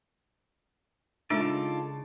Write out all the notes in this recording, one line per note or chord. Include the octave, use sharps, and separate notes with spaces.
C#3 G#3 D4 D#4 F4 A4 D5 E5